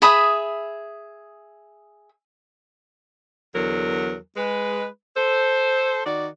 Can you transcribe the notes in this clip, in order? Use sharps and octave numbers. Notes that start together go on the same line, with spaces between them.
G#4 E5 B5 D#6
E2 D3 F#3 A#4
G#3 B4
A4 C5
D#3 F#4 D5